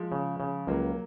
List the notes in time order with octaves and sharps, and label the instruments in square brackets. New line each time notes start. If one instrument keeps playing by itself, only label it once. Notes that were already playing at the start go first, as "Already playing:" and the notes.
Already playing: [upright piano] F3 G#3
[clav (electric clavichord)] C#3
C#3
[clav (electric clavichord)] C#2 [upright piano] F#3 A#3